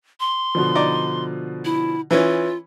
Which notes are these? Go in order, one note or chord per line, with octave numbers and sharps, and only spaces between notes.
C6
B2 D3 F3
D#4 D5
E4
E3 C#4 F4